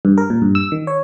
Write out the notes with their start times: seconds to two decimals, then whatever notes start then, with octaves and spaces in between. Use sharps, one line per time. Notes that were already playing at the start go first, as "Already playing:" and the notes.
0.05 G2
0.18 A#4
0.30 A#2
0.42 G2
0.55 E6
0.72 D#3
0.87 C#5